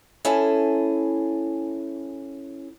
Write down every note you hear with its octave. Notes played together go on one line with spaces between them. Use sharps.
C#4 E4 G#4 A4 G#5